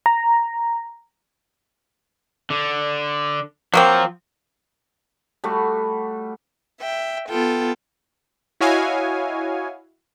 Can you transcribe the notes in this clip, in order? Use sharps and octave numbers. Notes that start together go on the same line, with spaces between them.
A#5
D3
F3 F#3 A#3 C4
G3 A3 F#4
E5 G5
B3 F4 A4 G5
E4 F#4 C#5 D#5 F5 G#5